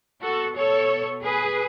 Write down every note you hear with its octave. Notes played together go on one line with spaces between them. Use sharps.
B2 F#4 A4
A4 C#5
G#4 B4